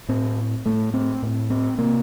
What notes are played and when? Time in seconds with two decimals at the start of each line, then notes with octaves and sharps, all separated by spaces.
0.09 A2 C4
0.66 A2 A3
0.94 C4
1.22 A2
1.50 C4
1.78 C3 A#3